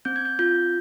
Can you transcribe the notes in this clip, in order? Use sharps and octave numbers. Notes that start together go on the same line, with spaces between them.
C4 G6
G#6
G6
F4 G6